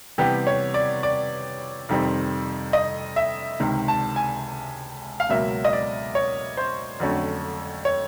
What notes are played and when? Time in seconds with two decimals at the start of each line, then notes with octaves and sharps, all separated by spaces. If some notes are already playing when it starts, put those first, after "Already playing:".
0.18 C3 E3 G3 B3 G4
0.47 C#5
0.74 D5
1.03 D5
1.89 F2 C3 D#3 G3 C4
2.73 D#5
3.16 E5
3.60 C#2 C3 D#3
3.88 A5
4.16 G#5
5.20 F5
5.29 C#2 B2 F#3 A#3 E5
5.65 D#5
5.73 D5
6.15 C#5
6.57 C5
7.00 F2 D3 F#3 A3 C#4
7.85 C#5